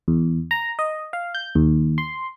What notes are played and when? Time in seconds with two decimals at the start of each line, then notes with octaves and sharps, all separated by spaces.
0.08 E2
0.51 A#5
0.79 D#5
1.13 F5
1.35 G6
1.55 D#2
1.98 C6